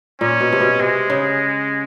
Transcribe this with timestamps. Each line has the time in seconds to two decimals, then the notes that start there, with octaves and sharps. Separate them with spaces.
0.21 A#2 C#4
0.40 B2
0.53 C3
0.60 B2
0.80 C3 G#3
1.10 C#3